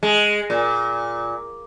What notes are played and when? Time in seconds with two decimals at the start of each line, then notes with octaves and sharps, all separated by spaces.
0.03 G#3
0.50 A#2